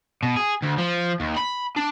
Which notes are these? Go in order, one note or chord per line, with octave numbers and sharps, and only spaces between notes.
B2
G#4
D2
F3
D#2
B5
D4